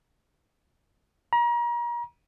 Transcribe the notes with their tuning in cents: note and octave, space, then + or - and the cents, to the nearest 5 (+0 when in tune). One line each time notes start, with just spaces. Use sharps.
A#5 +35